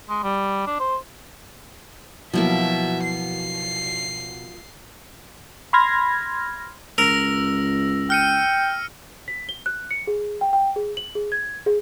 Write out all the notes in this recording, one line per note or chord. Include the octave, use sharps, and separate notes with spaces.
G#3
G3
D4
C5
B2 F3 F#3 A#3 E4 E5 C#6
C7
B5 C6 F6 G#6 A#6
C#2 A#4 E6 A#6
G5 F6 C#7 D#7
B6
G7
F#6
C#7
G#4
G5
G5
G#4
F#7
G#4
G#6
G#4